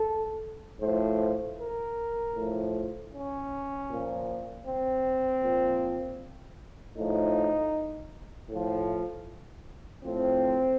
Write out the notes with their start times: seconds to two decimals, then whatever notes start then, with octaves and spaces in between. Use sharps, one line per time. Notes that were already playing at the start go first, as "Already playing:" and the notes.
Already playing: A4
0.81 A2 F3 C5
1.58 A#4
2.35 A2 F3
3.11 C#4
3.89 A#2 F3
4.65 C4
5.43 A#2 F3
6.96 A2 F3 D#4
8.50 A2 F3
10.04 A2 F3 C4